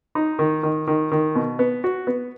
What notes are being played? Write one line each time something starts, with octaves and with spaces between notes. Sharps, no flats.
D#4
D#3
D#3
D#3
D#3
B2
B3
F#4
B3